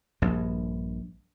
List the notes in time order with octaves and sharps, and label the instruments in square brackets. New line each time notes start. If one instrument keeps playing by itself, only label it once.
[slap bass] A#1 G2